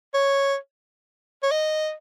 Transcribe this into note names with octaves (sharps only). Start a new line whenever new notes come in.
C#5
C#5
D#5